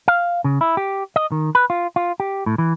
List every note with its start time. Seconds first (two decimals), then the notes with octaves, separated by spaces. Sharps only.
0.08 F5
0.44 C#3
0.61 E4
0.77 G4
1.16 D#5
1.32 D#3
1.55 B4
1.70 F4
1.96 F4
2.20 G4
2.46 A2
2.58 E3